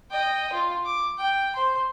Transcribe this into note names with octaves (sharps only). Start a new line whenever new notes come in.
D#5 G5
F4
D6
G5
C5 C6